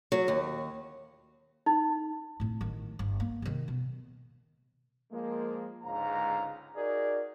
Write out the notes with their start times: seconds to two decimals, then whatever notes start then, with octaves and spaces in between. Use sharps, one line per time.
0.12 F#3
0.28 D#2
1.66 D#4
2.40 A2 C4
2.61 A1 D#3
2.99 G1
3.20 A#3
3.42 C3 D#3
3.68 B2
5.12 F3 G#3 A#3
5.83 C#2 G#2 D3 F5 A#5
6.75 D#4 F#4 G#4 A#4 D5